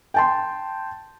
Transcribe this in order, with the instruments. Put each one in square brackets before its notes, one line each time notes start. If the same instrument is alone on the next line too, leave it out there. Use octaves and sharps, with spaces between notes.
[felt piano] G5 A5 C6